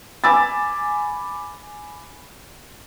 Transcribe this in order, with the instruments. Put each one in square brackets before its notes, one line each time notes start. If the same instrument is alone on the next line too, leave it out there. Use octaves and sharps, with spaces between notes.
[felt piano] G#5 B5 D6 E6 A6